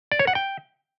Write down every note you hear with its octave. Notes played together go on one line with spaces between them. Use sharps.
D5
C#5
F#5
G5